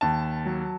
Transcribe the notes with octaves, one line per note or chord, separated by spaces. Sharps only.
D#2 A5
F#3